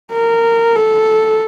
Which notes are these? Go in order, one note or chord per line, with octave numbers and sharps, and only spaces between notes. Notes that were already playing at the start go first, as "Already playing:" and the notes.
A#4
A4